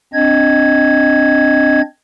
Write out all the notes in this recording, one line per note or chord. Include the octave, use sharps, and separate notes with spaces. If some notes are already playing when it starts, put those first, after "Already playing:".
C4 D4 D#5 G#6